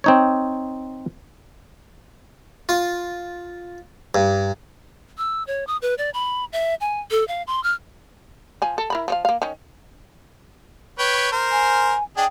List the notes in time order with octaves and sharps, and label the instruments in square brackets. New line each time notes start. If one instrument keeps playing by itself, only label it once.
[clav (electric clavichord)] C4 D#4 C#5
[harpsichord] F4
G2
[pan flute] E6
C#5
D#6
B4
D5
B5
E5
G#5
A4
F5
C6
F6
[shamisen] F3 G#5
A4
E4 A#4 B5
F3 C#5 F5
A#3 F5
D#3 C#4
[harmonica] B4 C#5 G5
A#4 C5
[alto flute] G#5
[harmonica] D4 G#4 D#5 [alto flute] G5